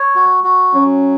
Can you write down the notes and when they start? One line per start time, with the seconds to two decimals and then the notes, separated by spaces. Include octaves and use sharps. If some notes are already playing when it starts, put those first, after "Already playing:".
Already playing: C#5
0.16 F#4
0.44 F#4
0.74 F#3 C#4